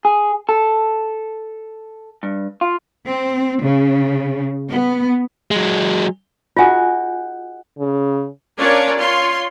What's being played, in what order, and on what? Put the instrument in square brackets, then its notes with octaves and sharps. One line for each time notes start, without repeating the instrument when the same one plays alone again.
[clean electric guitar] G#4
A4
G2
F4
[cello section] C4
C#3
B3
[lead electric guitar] F#3 G#3
[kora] D#4 F#4 G#4 [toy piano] F4 G#5
[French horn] C#3
[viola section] C#4 D4 F4 A#4 C#5 D5
F4 C#5 C6